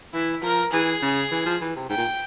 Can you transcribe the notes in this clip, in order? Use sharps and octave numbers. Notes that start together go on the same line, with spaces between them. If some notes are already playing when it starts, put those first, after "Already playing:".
E3 E4
F3 A#4
E3 G#4
C#3
E3
F3
E3
C3
G#2 G5
A#2